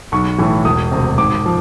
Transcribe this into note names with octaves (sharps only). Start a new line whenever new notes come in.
B1 C#6
A2 E3
E1 D#6
D2 C3
G#1 D6
F3